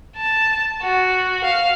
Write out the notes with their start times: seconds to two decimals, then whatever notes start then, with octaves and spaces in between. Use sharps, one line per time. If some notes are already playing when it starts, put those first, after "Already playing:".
0.17 A5
0.83 F#4
1.44 F5